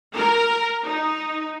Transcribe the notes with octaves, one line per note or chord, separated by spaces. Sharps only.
A#4
D#4